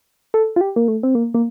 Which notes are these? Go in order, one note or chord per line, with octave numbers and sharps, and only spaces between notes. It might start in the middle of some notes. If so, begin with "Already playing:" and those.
A4
F4
G4
A#3
A3
C4
A#3
A#3